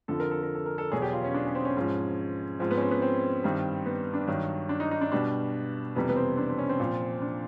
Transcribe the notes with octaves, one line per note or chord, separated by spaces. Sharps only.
F2 D3 F3 A4
A#4
A4
A#4
A4
A#4
A4
E2 B2 F#3 G#4
G4
F4
C#4
D4
C#4
C4
C#4
G#2 F3
G#2 F3 C4
B3
C#4
C4
B3
C4
G2 D#3 G3
B3
D4
G2 D#3 F#3
D4
D#4
D#4
D4
B2 G3 D4
F2 C3 E3 G3 B3
B3
C4
D4
C4
C#4
C4
A#2 F3
D4